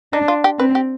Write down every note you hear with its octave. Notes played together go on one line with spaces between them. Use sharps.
D4 D#4
F4
G4
C4 B4
G4